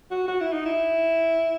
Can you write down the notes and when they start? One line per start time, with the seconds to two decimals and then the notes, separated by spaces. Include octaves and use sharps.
0.11 F#4
0.28 F#4
0.41 E4
0.52 D#4
0.66 E4